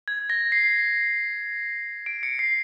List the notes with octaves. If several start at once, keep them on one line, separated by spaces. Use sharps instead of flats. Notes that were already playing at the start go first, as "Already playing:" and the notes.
G#6
A#6
C7
D7
C#7
C7